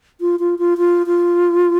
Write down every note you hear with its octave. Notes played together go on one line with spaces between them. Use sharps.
F4
F4
F4
F4
F4